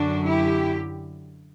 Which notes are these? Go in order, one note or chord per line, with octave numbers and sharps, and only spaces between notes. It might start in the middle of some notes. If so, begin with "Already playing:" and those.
Already playing: F#2 D3 D4 F#4
E4 G4